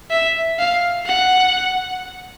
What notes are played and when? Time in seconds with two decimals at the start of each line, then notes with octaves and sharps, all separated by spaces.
0.11 E5
0.59 F5
1.06 F#5